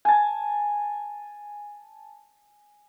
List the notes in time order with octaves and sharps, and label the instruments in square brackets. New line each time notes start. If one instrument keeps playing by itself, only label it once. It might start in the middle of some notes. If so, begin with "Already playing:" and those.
[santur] G#5 A5